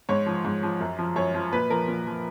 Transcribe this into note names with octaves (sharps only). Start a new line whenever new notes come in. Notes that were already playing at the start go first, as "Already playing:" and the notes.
G#2 C#5
F3
G#2
F3
F#2
F3
F#2 C#5
F3
A#2 B4
F3 A#4
A#2
F3